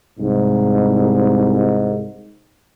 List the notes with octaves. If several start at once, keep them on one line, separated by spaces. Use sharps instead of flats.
C2 G#2